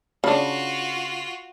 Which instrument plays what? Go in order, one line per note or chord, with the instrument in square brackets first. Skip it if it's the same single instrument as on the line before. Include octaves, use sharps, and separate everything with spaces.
[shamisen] C#3 D4 [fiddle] F4 F#4